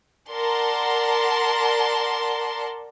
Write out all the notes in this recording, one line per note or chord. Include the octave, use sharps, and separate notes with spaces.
A#4 D5 F#5 A5 C6